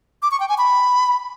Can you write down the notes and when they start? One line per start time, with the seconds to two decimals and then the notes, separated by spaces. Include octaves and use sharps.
0.22 D6
0.31 C#6
0.40 G5
0.49 G#5
0.58 B5